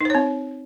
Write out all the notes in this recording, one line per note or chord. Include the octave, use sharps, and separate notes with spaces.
C4 D#4 C5 C#5